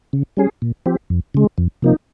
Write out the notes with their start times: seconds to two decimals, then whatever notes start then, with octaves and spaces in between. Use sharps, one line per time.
0.13 C#3
0.37 G3 C#4 G#4
0.62 A#2
0.86 F3 C4 G4
1.10 F2
1.34 C#3 G#3
1.58 F2
1.82 C3 F3 A#3 D#4